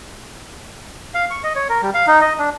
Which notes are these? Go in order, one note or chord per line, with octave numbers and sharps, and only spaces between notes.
F5
C#6
D#5
C#5
A#4
G3
F5
D#4
D#5
D4